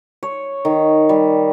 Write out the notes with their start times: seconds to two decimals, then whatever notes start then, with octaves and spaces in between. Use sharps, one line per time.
0.23 C#5
0.65 D#3
1.09 G3